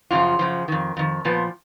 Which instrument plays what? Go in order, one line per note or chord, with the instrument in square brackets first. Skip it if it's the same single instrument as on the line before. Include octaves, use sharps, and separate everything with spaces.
[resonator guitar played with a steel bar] F#2 C#3 F3 F4
F#2 C#3 F3
F2 D#3
F2 D#3
A#2 F3 B3